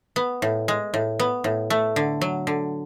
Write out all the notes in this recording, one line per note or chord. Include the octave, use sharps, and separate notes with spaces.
B3
A2
G#3
A2
B3
A2
A3
D3
F#3
D3